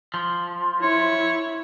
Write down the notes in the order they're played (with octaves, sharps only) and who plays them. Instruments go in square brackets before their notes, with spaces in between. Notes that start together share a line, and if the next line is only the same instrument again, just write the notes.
[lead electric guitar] F3
[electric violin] E4 [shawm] C#5